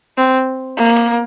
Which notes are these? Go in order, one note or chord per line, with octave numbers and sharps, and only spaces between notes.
C4
A#3